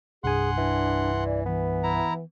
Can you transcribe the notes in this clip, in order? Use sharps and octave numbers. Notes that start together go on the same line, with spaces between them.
C2 G2 G#4 F#5 G#5 C6
E3 D4
D5
E3 B3
E4 A#5